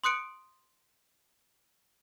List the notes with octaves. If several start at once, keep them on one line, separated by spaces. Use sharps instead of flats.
C6 D#6 F#6 C#7 D7